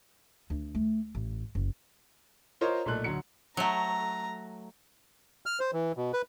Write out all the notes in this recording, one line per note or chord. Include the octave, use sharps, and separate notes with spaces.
D2
A3
A1
F#1
F4 A#4 C5 C#5 D#5
B1 A#2 A3 F#6
D2 F#3 C#7
F#3 A3 A#5
F6
C5
E3
B2
B4